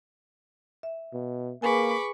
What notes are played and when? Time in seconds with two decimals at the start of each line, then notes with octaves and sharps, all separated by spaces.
0.83 E5
1.13 B2
1.62 A#3 G#4 B4 G#5 B5 C#6 D6